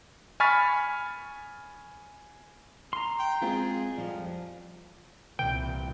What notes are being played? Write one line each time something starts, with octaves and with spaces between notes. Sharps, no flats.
G#5 B5 C#6 F6 A6 B6
A#5 C6
G5
G#3 C4 F4 G#4
F2 F3 G3
C2 A#2 E3 G5